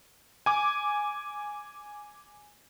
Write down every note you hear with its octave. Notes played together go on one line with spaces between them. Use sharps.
G#5 D6